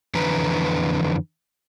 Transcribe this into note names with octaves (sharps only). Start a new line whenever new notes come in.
F2 D3 E3 B4 A#5